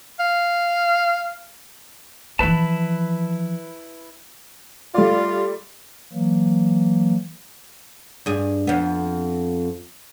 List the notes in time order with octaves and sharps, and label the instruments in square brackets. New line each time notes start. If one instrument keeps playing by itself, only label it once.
[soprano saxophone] F5
[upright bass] E3 F3 [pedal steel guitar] E4 B4 A5
[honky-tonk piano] G3 A3 D5 [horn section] F4
[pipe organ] E3 F#3 A#3
[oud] G2 G#4
F2 B3